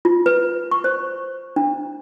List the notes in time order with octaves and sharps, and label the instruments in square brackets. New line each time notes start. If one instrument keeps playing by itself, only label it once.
[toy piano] F4
B4
C#6
C5
D4